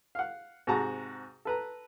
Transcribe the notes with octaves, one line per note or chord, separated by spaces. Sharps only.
F5 F#5
G#2 C3 F#4 A5 A#5
A4 B4 A#5